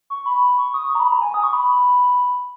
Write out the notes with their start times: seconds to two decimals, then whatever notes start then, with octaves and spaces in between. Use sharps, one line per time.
0.10 C#6
0.26 B5
0.58 C#6
0.74 D#6
0.90 C#6
0.95 A#5
1.00 B5
1.10 A#5
1.21 G#5
1.34 D#6
1.43 C#6
1.53 B5